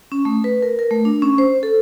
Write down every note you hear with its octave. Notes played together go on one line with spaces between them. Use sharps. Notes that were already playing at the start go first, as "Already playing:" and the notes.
C#4
A3
B4
A#4
A#4
A3
D4
C#4
C5
A4